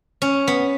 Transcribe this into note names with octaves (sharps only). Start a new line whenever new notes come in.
C#4
B3